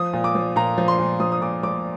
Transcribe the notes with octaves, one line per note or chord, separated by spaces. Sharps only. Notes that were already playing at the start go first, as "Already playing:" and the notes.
Already playing: F3 D#6
A#2
D6
F3
A#2 A#5
F3
C6
A#2
F3 D#6
D#6
A#2 D6
F3 D6